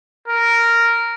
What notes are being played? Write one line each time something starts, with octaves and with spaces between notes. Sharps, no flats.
A#4